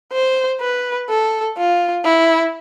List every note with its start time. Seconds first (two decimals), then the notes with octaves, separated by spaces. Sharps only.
0.12 C5
0.61 B4
1.09 A4
1.57 F4
2.04 E4